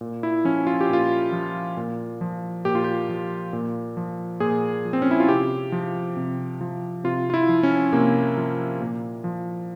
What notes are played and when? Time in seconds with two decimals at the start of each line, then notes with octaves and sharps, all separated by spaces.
0.01 A#2
0.23 E4
0.45 F3 C#4
0.67 F4
0.81 G4
0.89 A#2 F4
1.32 F3
1.77 A#2
2.21 F3
2.65 A#2 G4
2.75 F4
2.84 G4
3.09 F3
3.53 A#2
3.97 F3
4.40 A#2 G#4
4.85 F3
4.93 C4
5.02 C#4
5.11 E4
5.20 F4
5.29 C3 G4
5.72 F3
6.17 C3
6.61 F3
7.04 C3 F4
7.30 F4
7.34 E4
7.49 F3
7.63 C#4
7.93 C3 A#3
8.37 F3
8.81 A#2
9.24 F3